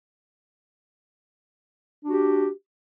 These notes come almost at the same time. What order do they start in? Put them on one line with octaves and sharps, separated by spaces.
D4 F#4 G4